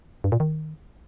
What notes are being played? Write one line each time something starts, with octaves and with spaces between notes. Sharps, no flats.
G2
A#2
D#3